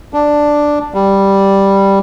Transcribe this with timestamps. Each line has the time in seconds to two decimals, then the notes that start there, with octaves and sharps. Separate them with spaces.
0.13 D4
0.94 G3